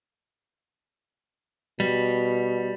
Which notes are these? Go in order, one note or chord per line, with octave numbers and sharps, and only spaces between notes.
B2 G3